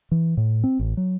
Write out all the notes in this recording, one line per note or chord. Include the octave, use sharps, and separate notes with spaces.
E3
A2
C4
A1
F#3